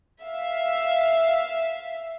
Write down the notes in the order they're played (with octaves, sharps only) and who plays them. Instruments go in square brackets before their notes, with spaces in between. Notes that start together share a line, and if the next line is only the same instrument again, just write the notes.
[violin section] E5 F5